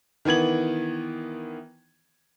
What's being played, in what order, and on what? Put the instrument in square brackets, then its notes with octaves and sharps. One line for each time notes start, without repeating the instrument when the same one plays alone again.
[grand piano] D#3 E3 B3 G#6 F#7